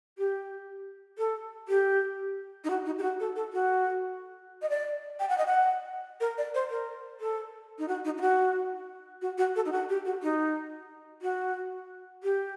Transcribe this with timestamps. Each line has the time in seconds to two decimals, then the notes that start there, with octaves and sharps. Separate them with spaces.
0.18 G4
1.18 A4
1.68 G4
2.64 D#4
2.70 F#4
2.86 D#4
2.99 G4
3.03 F#4
3.20 A4
3.36 A4
3.53 F#4
4.62 D#5
4.69 D5
5.20 G5
5.29 F#5
5.38 D#5
5.46 F#5
6.21 A#4
6.38 D5
6.55 C5
6.70 A#4
7.21 A4
7.79 D#4
7.88 F#4
8.05 D#4
8.18 D#4
8.21 F#4
9.22 F#4
9.38 F#4
9.56 A4
9.66 D#4
9.72 F#4
9.89 G4
10.05 F#4
10.23 D#4
11.22 F#4
12.23 G4